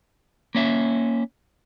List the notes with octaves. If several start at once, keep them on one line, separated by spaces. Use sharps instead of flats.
A#3 C#4 E5